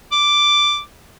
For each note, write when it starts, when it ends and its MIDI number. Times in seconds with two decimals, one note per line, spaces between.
0.12 0.81 86